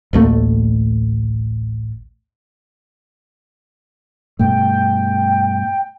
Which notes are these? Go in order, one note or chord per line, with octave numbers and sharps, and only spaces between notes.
A1 D2 A3 A#3
G2 B2 A3 G5